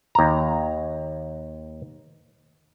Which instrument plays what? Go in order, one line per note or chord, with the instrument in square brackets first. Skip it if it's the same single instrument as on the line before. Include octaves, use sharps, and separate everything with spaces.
[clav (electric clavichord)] D#2 A#5